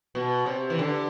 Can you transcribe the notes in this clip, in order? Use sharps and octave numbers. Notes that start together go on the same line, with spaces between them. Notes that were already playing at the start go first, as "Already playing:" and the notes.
B2
C3
E3
D3